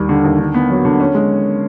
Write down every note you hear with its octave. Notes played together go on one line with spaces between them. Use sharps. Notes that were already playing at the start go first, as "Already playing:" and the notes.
Already playing: D#2 G3
D3
D#2
D3
B3
F#3
D3
C#4
G#3